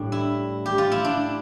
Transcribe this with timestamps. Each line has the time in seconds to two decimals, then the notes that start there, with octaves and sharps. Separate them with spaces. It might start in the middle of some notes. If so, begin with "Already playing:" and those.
Already playing: A2 G3 D4
0.12 E4
0.66 G4
0.78 F4
0.92 E4
1.04 D4